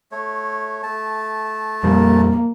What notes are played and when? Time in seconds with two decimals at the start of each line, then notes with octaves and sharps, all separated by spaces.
0.12 A3 C#5
0.83 A3 A5
1.83 F2 A#2 G3 A#3